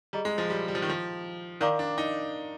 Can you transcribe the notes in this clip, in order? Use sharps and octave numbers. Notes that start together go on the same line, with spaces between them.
G3 G#4 D#5 A#5
G#3
F3
G3
G3
F3
D#3
F3
D#3 A#4 D5 F5 A#5 D6
D4
D#4